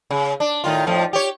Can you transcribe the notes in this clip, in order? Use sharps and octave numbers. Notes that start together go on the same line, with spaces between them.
C#3
D4
A2 D#3 F4
F2 A2 F3
G4 C#5